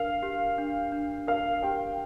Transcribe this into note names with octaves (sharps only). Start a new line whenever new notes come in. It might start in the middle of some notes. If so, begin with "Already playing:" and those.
Already playing: D4 A#4 F5
G4
D4
D4
A#4 F5
G4 G5